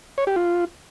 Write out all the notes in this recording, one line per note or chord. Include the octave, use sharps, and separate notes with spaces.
C#5
G4
F4